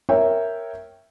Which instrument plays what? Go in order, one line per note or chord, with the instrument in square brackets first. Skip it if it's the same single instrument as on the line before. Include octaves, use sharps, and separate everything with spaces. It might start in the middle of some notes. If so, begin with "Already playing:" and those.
[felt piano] A#4 C#5 E5 G5